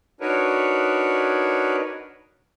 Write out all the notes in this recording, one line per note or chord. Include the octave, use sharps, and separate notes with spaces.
D4 D#4 F#4 A#4 B4 C#5